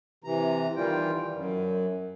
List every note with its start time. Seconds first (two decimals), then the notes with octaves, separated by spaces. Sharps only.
0.24 C3 E3 A#5
0.76 D#3 E3 G3 F4 G5
1.35 F#2